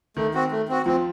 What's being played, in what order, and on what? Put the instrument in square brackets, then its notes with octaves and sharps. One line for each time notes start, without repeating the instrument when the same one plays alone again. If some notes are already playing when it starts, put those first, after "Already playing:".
[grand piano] D#3 [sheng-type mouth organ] A3
[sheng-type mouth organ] C4 F#4
A3
C4 F#4
[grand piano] F3 [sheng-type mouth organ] C4